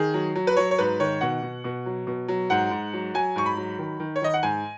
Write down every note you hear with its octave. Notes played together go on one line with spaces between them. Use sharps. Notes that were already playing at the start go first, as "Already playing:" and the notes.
Already playing: D#3 G#4
F#3
F#3
B4
F#3 C#5
C#5
G#2 B4
D#3 C#5
B2 F#5
B2
B2
F#3
B2
F#3
G#2 F#5
G#2
F#3
F#3 G#5
G#2 C#6
B5
F#3
D#3
D#3
C#5
D#3 D#5
F#5
G#2 G#5